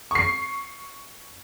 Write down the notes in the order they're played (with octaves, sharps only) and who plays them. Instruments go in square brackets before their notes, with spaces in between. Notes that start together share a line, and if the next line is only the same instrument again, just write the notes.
[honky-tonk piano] C#6 C7